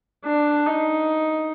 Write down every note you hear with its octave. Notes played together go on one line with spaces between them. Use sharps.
D4
D#4